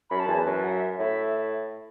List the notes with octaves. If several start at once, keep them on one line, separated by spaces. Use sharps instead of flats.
F#2 B5
A5
E2
F#2 B4
F#5
E5
A2 E5